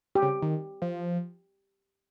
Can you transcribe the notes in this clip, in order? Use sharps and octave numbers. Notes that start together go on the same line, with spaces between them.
G4
C#3
D#3
F3